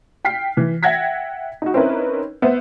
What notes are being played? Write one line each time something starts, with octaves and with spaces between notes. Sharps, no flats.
G5 F6 B6 C7
E3
E5 F#5 G5 G#6 A#6 B6
D#4 F#4
C4 C#4 D#4 E4 A#4 B4
B3 C5 E5